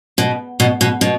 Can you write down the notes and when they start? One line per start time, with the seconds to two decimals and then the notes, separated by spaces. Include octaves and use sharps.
0.18 B2
0.60 B2
0.81 B2
1.01 B2